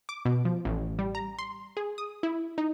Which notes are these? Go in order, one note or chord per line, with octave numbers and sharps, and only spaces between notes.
D6
B2
F3
A1
G3
A#5
C6
G#4
D#6
E4
D#4